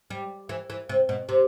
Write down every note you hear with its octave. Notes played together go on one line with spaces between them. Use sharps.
G3
E3
E3
C3
B2
C3